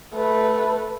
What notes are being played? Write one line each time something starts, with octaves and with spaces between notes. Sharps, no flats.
A3 B4